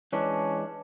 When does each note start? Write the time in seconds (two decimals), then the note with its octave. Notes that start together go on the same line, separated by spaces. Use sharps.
0.13 E3 G#3 C#4 D4